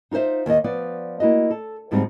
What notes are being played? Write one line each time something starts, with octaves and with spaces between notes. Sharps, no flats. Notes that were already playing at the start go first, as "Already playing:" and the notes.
D#4 F4 A#4 C5 E5
D#2 D#5
F3 B3 D5
A#3 E4 F#4 D#5
A4
D2 G#2 F3 G3 C4 D#4